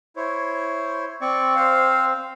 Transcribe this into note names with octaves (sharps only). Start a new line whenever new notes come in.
E4 C5 C#5
C4 D5 C#6
C5 F5